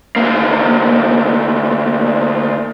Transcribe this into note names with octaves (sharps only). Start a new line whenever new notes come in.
D2 A#3